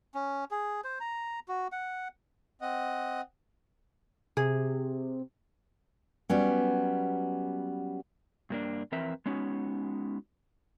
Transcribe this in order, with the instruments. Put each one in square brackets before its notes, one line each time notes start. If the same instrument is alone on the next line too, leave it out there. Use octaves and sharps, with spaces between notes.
[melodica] C#4
G#4
C5
A#5
F#4
F#5
[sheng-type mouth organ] C4 D#5 F#5
[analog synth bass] C3 [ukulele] G#4
[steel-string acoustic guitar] F#3 G3 B3 C#4
[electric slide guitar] G2 A#3 D4
F2 E3 C4 A#4 B4 E5
G#3 B3 C#4 D#4 F#4